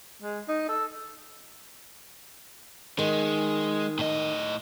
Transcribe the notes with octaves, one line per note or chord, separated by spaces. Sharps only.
G#3
D#4
A4
D#3 G#3
A2 D#5